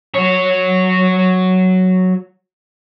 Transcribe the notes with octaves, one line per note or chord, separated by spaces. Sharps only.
F#3 C#5